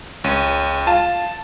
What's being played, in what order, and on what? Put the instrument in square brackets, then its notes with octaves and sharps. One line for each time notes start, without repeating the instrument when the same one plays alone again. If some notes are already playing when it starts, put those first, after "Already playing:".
[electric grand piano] C#2 [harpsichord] C#4
[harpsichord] F4 [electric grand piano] A5